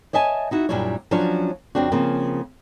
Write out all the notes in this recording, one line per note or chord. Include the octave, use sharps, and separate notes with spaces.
C#5 D#5 E5 G#5 A5
D#4 E4 F#4 E5
F#2 A#2 G3 D4 E4 C#5
F3 F#3 C#4 D4 F4 C#5
F2 C#3 C4 D4 F#4
C#3 F3 A#3 C4